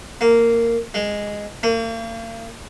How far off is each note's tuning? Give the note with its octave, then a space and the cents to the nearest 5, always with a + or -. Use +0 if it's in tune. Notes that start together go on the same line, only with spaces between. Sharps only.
A#3 -10
G#3 -5
A#3 -40